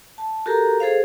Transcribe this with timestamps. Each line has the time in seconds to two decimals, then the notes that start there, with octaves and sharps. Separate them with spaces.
0.18 A5
0.46 F#4 G4 A4 A#4 A#5
0.80 G#4 A4 C5 F5